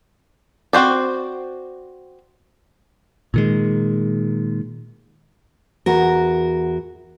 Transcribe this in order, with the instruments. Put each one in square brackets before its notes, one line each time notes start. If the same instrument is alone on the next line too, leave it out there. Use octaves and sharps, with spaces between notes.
[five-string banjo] C4 F#4 C5 D5
[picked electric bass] A#2 D#3 G#3
[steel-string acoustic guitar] E2 F#4 A#4